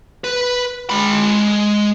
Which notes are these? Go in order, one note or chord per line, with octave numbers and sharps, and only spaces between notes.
B4
G#3 B5